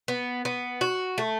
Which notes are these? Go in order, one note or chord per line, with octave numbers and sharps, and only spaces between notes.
B3
B3
F#4
A3